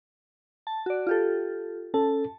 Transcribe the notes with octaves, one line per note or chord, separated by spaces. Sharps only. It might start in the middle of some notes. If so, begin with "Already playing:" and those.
A5
F#4 D5
F4 G4 A4
C#4 A4 A5